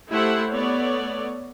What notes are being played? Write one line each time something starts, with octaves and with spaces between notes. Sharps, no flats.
A3 E4 G4 C5 E5 F#5
A3 B3 C#5 D5